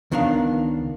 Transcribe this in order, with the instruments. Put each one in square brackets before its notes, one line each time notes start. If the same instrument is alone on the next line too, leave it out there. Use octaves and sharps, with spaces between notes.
[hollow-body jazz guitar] C#2 D#3 B3 D4 A#4 F5